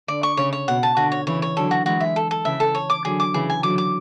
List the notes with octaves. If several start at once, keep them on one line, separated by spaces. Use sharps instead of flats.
D3 D5
C#6
C#3 C#5
C#5
B2 F#5
A5
D3 F#4
C#5
C#3 E3 C#5
C#5
D3 F#3 A4
F#4
E3 G#3 F#4
E5
A4
A4
C#3 E3 E5
A4
C#5
D6
D3 F#3 G#4
D6
C#3 E3 G#4
G#5
D3 F#3 D6
D6